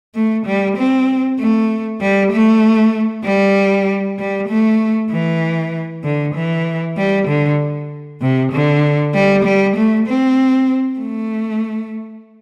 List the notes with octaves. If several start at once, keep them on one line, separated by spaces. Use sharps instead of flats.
A3
G3
C4
A3
G3
A3
G3
G3
A3
E3
D3
E3
G3
D3
C3
D3
G3
G3
A3
C4
A3